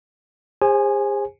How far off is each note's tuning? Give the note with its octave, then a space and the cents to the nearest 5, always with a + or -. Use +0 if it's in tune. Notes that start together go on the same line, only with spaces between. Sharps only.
G#4 -40 C5 +30 G#5 +0